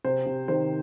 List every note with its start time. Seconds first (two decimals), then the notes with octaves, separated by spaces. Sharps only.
0.04 C3 C5
0.26 C3
0.48 D#3 C5